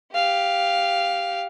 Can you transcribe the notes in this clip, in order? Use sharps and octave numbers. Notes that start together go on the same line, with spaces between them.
G4 F5